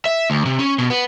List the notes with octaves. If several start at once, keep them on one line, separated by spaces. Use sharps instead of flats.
E5
D2
C3
C#4
B2
B3